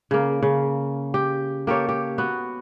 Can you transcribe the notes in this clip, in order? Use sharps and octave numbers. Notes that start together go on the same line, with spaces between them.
C#3 A#3
C#3
G4
A#3 G4 A4 C#5
G4
B3 F#4